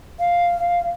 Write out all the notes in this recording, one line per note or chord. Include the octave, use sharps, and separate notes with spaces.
F5